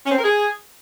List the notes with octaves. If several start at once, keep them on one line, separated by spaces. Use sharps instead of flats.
C#4
C4
A#4
G#4